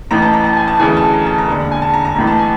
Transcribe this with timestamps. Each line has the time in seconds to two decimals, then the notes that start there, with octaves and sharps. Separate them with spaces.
0.11 A1 A2 E3 A#5
0.22 A5
0.33 A#5
0.45 A5
0.57 G#5
0.68 A5
0.79 D2 C#3 E3 G#5
0.97 A5
1.13 A#5
1.26 A5
1.38 A#5
1.48 E1 D#2 D3
1.72 G#5
1.82 A5
1.94 A#5
2.05 A#5
2.16 A1 A2 E3 A#5
2.27 A5
2.39 G#5